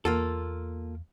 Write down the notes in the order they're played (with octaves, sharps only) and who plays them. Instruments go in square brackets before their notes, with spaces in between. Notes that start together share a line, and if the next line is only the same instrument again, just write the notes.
[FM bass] E2 [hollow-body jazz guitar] A#3 F4 A4